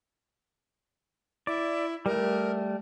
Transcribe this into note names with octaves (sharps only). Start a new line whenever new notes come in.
E4 D5
G3 A3 A#4